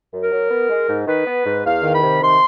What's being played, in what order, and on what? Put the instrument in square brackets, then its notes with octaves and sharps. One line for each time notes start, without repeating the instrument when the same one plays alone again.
[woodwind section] F#2
A#4
F#3
B3
G#3
G#2
D#3 B4
B3
G#2
E2 F5
D#3
B5
C3
D#3 C6